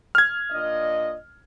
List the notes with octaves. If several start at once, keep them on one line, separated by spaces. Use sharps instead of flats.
F6 G#6
A#2 D4 D#5